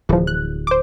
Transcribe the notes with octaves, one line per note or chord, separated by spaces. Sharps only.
D1 E3 F3
F#6
C5 D6